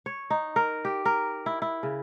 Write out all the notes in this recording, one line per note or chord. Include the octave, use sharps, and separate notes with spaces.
C#5
D#4
A#4
G4
A#4
E4
E4
C#3